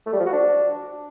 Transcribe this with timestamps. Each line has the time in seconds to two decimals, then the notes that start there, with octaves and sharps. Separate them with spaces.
0.06 A3
0.13 G3
0.20 F3
0.26 F#4
0.33 D4